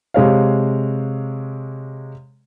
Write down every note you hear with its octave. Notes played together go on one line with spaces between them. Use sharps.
C3 G#3 C#5 F5